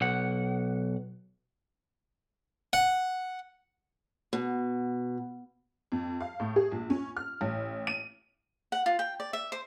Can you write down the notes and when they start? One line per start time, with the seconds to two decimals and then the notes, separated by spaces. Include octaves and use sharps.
0.01 B1 F#5
2.73 F#5
4.33 B2
5.92 F2
6.21 F5
6.40 A2
6.56 G#4
6.72 A#1
6.90 C#4
7.17 F6
7.41 A1
7.87 D#7
8.72 F#5
8.86 F4
8.99 G5
9.20 D5
9.33 E5
9.52 C5